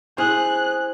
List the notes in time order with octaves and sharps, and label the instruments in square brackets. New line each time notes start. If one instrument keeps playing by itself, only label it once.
[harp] E4 C5 [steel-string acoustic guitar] G#4 [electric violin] F#6